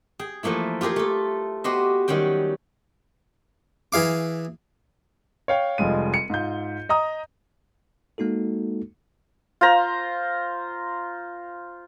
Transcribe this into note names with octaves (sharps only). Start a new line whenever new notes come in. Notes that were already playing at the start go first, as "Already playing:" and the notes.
G#4 G5
E3 F3 A3 A#3 E4
F4 G4 G#4 A#4 C5
A3 A4
B3 F#4 G4 C5 D#5
D#3 F#3 G3 C#4 G5
E3 G#4 F5 D6
C#5 F5 G5
F1 F3 G3 G#3 D#7
C#7
G#2 F4 G6
D#5 A#5 D#6
G#3 A#3 D#4 F#4 A4
F4 C5 A#5